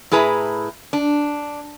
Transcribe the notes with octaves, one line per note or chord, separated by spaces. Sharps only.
A2 E4 G#4 B4 A#5
D4